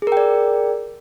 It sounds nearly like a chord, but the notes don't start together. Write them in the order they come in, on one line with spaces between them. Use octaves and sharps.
G#4 A#4 G5 D5